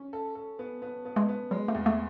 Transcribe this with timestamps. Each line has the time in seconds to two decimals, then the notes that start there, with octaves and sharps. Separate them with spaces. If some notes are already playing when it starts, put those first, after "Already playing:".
Already playing: C#4
0.13 A4
0.35 A4
0.59 B3
0.82 B3
1.05 B3
1.16 G#3
1.28 B3
1.51 F#3 G#3
1.68 A3
1.75 E2
1.86 A3